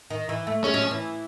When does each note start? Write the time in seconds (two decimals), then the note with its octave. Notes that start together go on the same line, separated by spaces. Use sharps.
0.10 D#3
0.29 E3
0.47 A3
0.64 G#3 C#4
0.74 F#3
0.82 F3
0.91 E3